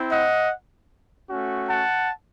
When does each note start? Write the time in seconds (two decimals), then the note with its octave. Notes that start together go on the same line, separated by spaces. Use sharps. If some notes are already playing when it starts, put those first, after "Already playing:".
Already playing: C4 E4
0.10 D#5 F#5
1.29 A3 C#4 F#4
1.68 F#5 A5